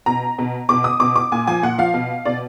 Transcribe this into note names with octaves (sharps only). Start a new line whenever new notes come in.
B2 A#5
B2
B2 D6
D#6
B2 D6
D6
A#2 G#5
F3 G#5
A#2 F#5
F3 F5
B2
B2 D5